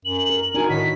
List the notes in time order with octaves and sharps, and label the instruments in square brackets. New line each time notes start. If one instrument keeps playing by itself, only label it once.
[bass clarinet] F#2 [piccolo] F#7
[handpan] A#4
[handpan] D4 D#4 F#4 [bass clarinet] A#4 [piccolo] G#5
[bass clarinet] A2 [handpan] D#3 [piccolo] B6